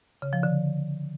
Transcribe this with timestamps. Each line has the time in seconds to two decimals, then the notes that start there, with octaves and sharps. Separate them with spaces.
0.22 C#3
0.33 F3
0.43 D3